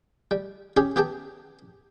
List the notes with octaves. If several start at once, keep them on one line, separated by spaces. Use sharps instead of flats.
G3
C#4 G4 G#4
B3 G4 G#4 G5 A5